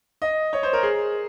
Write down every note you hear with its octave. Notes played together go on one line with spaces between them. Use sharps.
D#5
C#5
C5
A#4
G#4